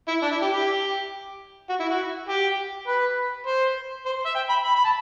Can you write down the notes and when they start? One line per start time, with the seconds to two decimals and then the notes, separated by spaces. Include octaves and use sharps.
0.08 E4
0.22 D4
0.32 E4
0.42 G4
0.52 G4
1.69 F#4
1.80 E4
1.89 F#4
2.29 G4
2.88 B4
3.47 C5
4.06 C5
4.25 E5
4.35 G5
4.50 B5
4.65 B5
4.75 B5
4.85 A5